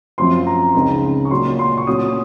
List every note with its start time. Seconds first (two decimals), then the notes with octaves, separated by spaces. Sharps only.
0.18 F#2 F3 C4 C6
0.47 A#5
0.75 C#2 C#3 G#3 C4 D#4
1.25 C#6
1.30 A#2 F#3 C#4 C6
1.59 C6
1.77 C#6
1.87 A#2 F#3 C#4 D#6